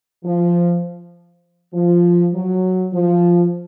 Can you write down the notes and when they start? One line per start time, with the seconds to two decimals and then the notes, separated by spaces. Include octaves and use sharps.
0.24 F3
1.73 F3
2.33 F#3
2.93 F3